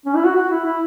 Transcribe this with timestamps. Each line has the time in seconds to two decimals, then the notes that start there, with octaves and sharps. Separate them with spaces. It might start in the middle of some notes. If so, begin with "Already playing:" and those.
0.05 C#4
0.16 E4
0.25 F#4
0.35 F#4
0.50 E4
0.65 E4